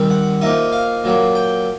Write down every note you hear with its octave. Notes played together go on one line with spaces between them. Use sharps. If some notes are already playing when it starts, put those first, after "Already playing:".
Already playing: D#3 G3 C4
F#5
F3 A#3 D#4 E5
F5
A#2 F#3 A#3
G5